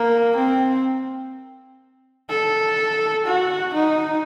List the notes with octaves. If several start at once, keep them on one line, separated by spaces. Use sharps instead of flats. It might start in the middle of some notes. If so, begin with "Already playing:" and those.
Already playing: A#3
C4
A4
F#4
D#4